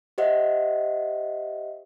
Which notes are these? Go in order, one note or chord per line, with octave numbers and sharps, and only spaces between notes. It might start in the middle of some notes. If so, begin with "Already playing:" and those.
G4 C5 D#5 E5 F#5